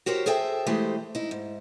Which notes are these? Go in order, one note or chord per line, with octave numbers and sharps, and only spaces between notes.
F#4 G4 A#4 C5 C#5
G#4 A4 C5 E5 G5 A5
E3 G#3 A3 G4 C5 D#5
D#4 E4
G#2